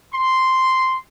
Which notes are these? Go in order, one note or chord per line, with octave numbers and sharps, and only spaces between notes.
C6